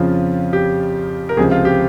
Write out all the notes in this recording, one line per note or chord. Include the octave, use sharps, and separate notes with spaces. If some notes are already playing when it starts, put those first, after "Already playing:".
Already playing: F2 C#3 F3 F4
G4
A#4
C#2 C3 F3 G#4
F4
G4